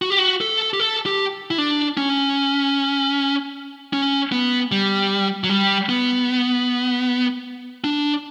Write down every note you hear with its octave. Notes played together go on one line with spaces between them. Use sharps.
F#4
G4
F#4
A4
G4
A4
G4
E4
D4
C#4
C#4
B3
G3
F#3
G3
B3
D4